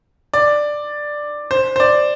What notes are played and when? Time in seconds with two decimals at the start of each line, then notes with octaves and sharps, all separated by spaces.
0.34 D5
1.51 C5
1.76 C5
1.80 D5